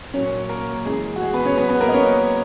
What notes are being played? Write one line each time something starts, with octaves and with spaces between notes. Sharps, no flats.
A#2 F#3 C#4 C#5
A#3 A#4
C#3 E3 G#3 G#4
F#4
G#3 G#4
B3 B4
C#4 C#5
C#3 F#3 B3 B4
B3 B4
A#3 A#4
D#5
C#4 C#5